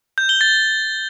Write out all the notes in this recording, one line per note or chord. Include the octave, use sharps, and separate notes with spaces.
G6
G7
A6